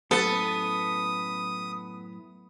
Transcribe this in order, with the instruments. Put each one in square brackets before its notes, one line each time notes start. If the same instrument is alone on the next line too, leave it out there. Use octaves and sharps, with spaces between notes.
[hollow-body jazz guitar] F#2 A2 [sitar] B3 [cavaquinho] A4 A5 [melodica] D#6